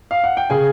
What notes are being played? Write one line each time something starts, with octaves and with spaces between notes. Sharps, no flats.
F5
F#5
G5
C#3 G#4 G#5